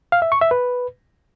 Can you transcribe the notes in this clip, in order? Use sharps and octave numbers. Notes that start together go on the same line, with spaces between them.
F5
E5
C#6
E5
B4